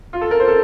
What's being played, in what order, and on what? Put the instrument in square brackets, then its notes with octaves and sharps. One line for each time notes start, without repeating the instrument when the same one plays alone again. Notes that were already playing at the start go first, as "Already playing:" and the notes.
[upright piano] F4
A4
A#4
C5
A4